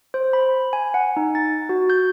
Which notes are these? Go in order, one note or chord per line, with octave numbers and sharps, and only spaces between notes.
C5
B5
G#5
F#5
D#4
A6
F#4
G6